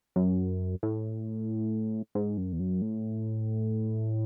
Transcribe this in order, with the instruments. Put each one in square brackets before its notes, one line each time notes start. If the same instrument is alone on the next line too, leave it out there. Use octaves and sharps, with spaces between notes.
[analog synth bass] F#2
A2
G#2
F#2
E2
F#2
A2